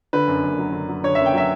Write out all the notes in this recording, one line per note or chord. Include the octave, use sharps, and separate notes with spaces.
D3 B4
F#2
F#1
F#3
D3
F#3
D3 C#5
E5
F#1
G5
F#3 E5